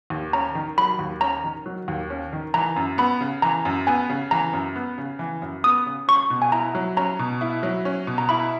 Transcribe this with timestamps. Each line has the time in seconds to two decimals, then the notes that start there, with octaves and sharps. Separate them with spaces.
0.10 D#2
0.33 C#4 A#5
0.55 D#3
0.78 F#3 B5
0.99 D#2
1.21 C#4 A#5
1.44 D#3
1.66 F#3
1.88 D#2
2.10 C#4
2.33 D#3
2.54 E3 A#5
2.76 F#2
2.98 B3 B5
3.21 C#3
3.42 E3 A#5
3.65 F#2
3.87 B3 G#5
4.09 C#3
4.31 E3 A#5
4.53 F#2
4.76 B3
4.98 C#3
5.19 E3
5.42 F#2
5.64 B3 D#6
5.86 C#3
6.08 C#4 C#6
6.30 B2
6.42 G#5
6.52 E4 A#5
6.75 F#3
6.97 C#4 A#5
7.19 B2
7.41 E4
7.63 F#3
7.85 C#4
8.07 B2
8.18 A#5
8.29 E4 B5